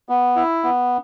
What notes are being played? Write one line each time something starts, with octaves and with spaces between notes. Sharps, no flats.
B3
E4
B3